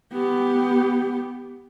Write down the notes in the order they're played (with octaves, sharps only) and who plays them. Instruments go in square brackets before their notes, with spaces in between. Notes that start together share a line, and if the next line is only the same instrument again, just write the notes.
[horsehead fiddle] B3 G4